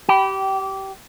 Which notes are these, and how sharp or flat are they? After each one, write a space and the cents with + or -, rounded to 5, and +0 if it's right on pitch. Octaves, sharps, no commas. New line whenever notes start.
G4 -20 G5 -25 B5 +0